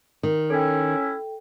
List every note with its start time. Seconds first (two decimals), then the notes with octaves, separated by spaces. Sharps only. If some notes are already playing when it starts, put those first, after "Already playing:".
0.23 D#3
0.50 C#4 E4 A4 G5